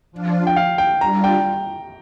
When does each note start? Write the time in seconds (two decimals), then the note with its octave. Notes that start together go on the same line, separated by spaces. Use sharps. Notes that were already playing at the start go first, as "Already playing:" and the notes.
0.12 F3 D4 F4
0.47 G5
0.56 F5
0.78 G5
1.01 G3 D4 F4 A#5
1.24 G5